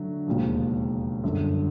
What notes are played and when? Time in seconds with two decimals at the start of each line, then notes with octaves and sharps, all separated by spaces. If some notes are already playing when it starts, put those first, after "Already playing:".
Already playing: D3 F#3 A3
0.27 E1 D#2 C#3 F3
1.24 G1 F#2 D3